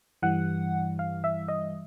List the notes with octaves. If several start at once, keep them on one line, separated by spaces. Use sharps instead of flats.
G2 E3 G3 F#5
F5
E5
D#5